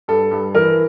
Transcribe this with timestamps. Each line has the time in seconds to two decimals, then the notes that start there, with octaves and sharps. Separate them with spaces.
0.08 G2 A4
0.31 G2
0.55 E3 A#4